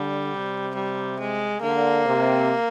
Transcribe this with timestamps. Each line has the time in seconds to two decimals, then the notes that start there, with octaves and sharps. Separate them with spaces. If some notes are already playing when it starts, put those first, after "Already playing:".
Already playing: D3 G3
0.32 C3
0.75 G3
1.20 G#3
1.62 D3 A#3
2.06 C3